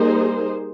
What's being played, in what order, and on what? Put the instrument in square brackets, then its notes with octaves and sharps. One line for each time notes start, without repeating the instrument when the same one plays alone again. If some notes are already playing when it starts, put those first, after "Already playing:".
Already playing: [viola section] G3 A#3 D#4 G#4 C5